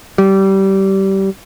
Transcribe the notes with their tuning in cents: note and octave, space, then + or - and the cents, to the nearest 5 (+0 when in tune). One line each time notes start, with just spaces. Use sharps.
G3 -20